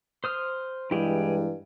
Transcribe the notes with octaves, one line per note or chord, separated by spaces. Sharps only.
C5 D#6 F6
G2 E3 G#3 E4 G4 G#4